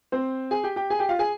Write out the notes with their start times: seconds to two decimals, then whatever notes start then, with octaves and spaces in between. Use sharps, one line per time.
0.12 C4 C5
0.51 G#4 G#5
0.64 G4 G5
0.76 G4 G5
0.90 G#4 G#5
0.99 G4 G5
1.09 F4 F5
1.19 G#4 G#5